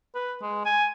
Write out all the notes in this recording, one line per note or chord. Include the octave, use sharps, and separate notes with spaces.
B4
G#3
G#5